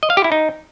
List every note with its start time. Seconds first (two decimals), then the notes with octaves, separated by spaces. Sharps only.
0.03 D#5
0.10 F5
0.17 G4
0.24 E4
0.32 D#4